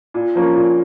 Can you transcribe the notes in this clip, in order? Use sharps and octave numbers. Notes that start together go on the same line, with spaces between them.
A#2
F3 A#3 C#4
A#2